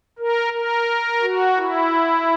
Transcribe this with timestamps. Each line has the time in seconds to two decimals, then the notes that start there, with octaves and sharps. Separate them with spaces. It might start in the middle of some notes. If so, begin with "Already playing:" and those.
0.19 A#4
0.53 A#4
1.22 F#4
1.57 E4